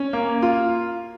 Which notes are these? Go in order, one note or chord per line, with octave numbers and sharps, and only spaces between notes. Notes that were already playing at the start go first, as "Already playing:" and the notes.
Already playing: C#4
A#3
F4